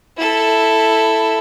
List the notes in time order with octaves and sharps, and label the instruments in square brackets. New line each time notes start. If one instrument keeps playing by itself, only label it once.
[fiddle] E4 A4